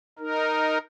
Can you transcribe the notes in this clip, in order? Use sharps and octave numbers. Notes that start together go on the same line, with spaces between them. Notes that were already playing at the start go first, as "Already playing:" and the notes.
D#4 A#4